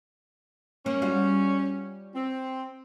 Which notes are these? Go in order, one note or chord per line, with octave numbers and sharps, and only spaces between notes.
A#3 C#4
G3 F4 F#4
C4